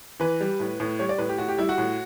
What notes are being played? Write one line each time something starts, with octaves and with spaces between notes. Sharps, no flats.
E3 B4
G3
A2
A2
G3 C#5
D5
A2 B4
G4
A2 F#4
G4
G3 E4
F#4
A2